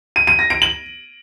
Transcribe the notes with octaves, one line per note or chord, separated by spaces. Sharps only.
D#7
D#7
A#6
D7
F#7